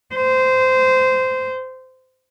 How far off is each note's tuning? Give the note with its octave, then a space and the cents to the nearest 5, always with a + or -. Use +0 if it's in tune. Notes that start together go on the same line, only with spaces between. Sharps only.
C5 -20